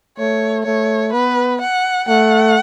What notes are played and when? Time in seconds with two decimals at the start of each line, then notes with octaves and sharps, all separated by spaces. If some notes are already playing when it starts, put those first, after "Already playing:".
0.18 A3 C#5
0.66 A3 C#5
1.13 B3 B4
1.61 F#5
2.09 A3 F#5